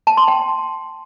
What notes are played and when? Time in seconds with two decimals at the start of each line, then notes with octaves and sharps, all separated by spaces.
0.07 A5
0.17 C6
0.28 G5